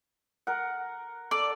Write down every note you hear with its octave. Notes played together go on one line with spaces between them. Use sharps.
A#4 F#5
A4 D5